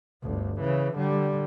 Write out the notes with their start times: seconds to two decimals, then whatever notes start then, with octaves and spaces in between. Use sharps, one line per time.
0.23 G1 D2
0.61 C#3 E3
0.95 D3 G3